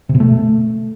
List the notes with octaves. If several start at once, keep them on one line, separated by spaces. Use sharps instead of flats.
C3
B2
A3